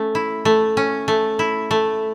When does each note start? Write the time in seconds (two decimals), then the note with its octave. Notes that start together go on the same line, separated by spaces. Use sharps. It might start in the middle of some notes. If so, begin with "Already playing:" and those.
Already playing: A3 C#4
0.15 E4
0.45 A3
0.77 C#4
1.08 A3
1.39 E4
1.71 A3